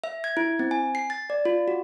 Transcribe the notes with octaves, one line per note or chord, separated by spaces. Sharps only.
E5
G#6
E4
C4
G#5
C7
A6
D5
F4
F#4